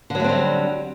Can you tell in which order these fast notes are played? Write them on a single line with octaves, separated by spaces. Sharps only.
D3 F#3 A3 C4 G3